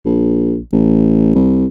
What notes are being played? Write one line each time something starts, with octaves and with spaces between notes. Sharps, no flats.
A#1
A1
C2